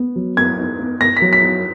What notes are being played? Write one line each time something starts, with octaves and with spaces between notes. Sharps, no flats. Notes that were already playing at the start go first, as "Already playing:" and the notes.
Already playing: B3
F#3
B3 G#6
D#4
B3
B3 A#6
B6
F#3
B6
D#4